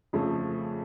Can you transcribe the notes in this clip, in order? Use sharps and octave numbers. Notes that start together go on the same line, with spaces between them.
F2 C#3 F3 A3